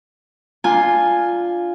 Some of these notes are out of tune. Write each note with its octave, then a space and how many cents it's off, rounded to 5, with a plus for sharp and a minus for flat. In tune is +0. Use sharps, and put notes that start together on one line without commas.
D4 +0 F4 +0 G#5 +0